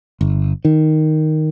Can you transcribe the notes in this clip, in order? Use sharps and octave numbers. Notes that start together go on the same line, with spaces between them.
G1
D#3